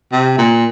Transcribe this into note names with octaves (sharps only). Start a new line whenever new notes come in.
C3
A#2